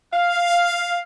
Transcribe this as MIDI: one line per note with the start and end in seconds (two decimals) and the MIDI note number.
0.14 1.01 77